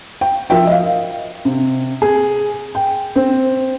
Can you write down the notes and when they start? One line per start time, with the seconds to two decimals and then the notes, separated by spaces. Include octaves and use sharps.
0.21 G5
0.50 F3 A#4 E5 G5
0.67 D#5 F5
1.45 C3
2.02 G#4
2.75 G5
3.16 C4